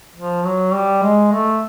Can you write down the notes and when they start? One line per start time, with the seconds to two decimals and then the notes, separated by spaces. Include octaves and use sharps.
0.16 F3
0.45 F#3
0.74 G3
1.03 G#3
1.32 A3